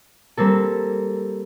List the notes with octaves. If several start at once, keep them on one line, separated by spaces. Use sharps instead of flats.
G3 A#3 C4 A4